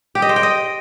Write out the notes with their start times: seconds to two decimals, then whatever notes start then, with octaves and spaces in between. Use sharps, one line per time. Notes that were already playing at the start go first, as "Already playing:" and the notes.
0.15 G4
0.22 D#5
0.29 C5
0.36 G5
0.43 D#5